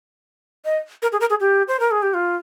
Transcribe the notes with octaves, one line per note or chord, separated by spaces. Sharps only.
D#5
A#4
G#4
A#4
G#4
G4
C5
A#4
G#4
G4
F4